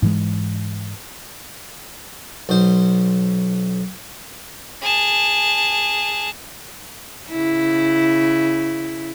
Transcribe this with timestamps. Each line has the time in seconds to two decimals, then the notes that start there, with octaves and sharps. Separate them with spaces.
0.02 G#2 E3 G#3
2.49 B1 C5
4.82 G#4 A5
7.30 C#3 E4